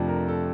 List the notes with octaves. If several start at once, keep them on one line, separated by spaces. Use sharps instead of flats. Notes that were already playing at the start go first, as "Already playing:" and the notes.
Already playing: F2 C3 F3 A3 D4
A#4
A4